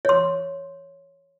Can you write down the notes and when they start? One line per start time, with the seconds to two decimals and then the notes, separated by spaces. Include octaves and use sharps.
0.05 C#5 C6